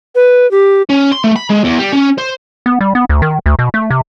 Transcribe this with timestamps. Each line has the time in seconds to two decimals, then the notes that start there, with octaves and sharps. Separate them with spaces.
0.15 B4
0.51 G4
0.90 C#4
1.12 C6
1.24 A3
1.36 B5
1.50 G#3
1.64 E2
1.79 G3
1.92 C#4
2.18 C5
2.66 B3
2.81 G3
2.95 B3
3.09 D2
3.22 D#3
3.46 D2
3.59 B2
3.74 A3
3.90 C3